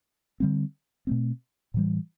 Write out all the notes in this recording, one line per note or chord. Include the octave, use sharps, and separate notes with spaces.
D3 G3 C4
B2 A3 C4
A2 E3 G3